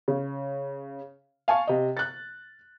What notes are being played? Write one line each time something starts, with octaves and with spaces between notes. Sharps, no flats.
C#3
F5 G#5 A5 C#6
C3 D#5
F#6 A6